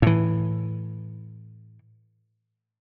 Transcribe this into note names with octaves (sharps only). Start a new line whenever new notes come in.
A2 E3